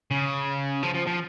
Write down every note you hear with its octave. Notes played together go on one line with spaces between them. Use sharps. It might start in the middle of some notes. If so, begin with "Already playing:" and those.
C#3
F3
F3
F3